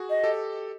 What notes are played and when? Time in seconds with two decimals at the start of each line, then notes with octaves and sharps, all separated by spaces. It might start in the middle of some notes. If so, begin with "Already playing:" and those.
Already playing: F#4 G#4
0.10 D#5
0.24 G4 A4